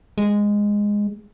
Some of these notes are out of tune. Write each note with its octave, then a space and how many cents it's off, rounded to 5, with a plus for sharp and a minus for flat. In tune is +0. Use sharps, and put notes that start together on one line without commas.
G#3 -10